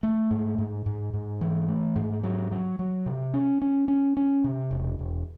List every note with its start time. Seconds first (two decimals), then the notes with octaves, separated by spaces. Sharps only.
0.03 A3
0.31 G#2
0.58 G#2
0.86 G#2
1.13 G#2
1.41 E3
1.68 A3
1.96 G#2
2.23 F#3
2.51 F#3
2.79 F#3
3.06 C3
3.34 C#4
3.62 C#4
3.88 C#4
4.17 C#4
4.44 C3
4.71 E1
4.99 E1